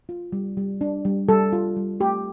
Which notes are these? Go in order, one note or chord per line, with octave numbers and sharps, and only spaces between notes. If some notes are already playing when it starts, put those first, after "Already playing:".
F4
G3
G3
D4
G3
G3 A4
F4
G3
A3 G4